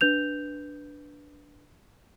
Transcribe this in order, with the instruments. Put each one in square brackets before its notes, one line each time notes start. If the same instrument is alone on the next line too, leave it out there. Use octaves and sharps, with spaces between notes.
[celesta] D4 B4 G6 F7